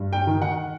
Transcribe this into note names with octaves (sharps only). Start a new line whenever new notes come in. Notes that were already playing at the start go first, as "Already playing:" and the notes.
Already playing: G2
G5
D#3
F#5